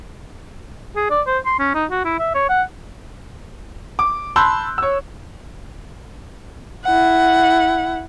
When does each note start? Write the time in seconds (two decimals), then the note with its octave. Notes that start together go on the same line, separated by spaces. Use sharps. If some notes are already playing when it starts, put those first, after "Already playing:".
0.96 G#4
1.10 D5
1.27 C5
1.46 C6
1.59 C#4
1.75 D#4
1.91 F#4
2.05 E4
2.19 E5
2.35 C#5
2.49 F#5
3.99 D6
4.36 A5 B5 C6 E6 F#6 G6
4.78 C#5 E6
6.84 E4 F#5